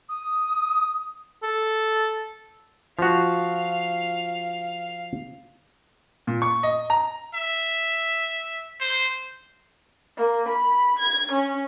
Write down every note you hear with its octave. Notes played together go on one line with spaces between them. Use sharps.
D#6
A4
F3 F#4 F5
A#2
C#6
D#5
A#5
E5
C5
A#3
B5
G#6
C#4